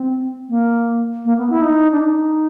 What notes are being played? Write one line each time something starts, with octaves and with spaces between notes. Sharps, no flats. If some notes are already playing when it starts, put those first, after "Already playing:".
Already playing: C4
A#3
A#3
B3
E4
D#4
D4
D#4